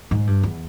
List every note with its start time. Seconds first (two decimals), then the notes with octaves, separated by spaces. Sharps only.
0.11 G#2
0.27 G2
0.43 E2